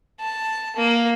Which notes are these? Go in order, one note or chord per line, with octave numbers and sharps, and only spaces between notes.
A5
A#3